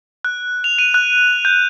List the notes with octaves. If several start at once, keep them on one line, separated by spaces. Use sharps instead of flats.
F#6
F7
D#7
F#6
G6